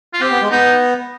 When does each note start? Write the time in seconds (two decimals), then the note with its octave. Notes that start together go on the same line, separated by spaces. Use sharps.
0.14 F4
0.21 C4 G4
0.31 B3
0.42 G#3
0.51 B3 D#4